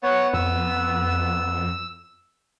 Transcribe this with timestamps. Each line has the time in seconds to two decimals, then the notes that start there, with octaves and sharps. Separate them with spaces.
0.03 B3 C#5 F#5
0.33 F2 E6